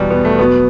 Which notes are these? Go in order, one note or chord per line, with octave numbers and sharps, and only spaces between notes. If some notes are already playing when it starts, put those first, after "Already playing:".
Already playing: E2 B2 G3
B3
A3
B2 F#3 B3